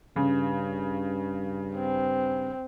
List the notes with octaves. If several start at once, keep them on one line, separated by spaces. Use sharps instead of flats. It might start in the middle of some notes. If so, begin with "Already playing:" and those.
G2 C#3
C4